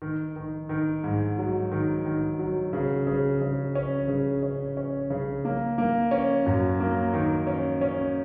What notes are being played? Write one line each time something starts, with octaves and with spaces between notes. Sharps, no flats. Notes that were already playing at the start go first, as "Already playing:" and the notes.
D#3
D#3
D#3
G#2
F#3
D#3
D#3
F#3
C#3
C#3
C#3
C#4
C#3
C#4
C#4
C#3
A#3
A#3
C#4
F#2
A#3
D#3
C#4
C#4